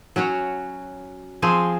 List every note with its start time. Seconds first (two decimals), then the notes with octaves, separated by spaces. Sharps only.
0.16 F#3 C#4 F#4 C#5
1.42 F3 C4 G#4 C5 G#5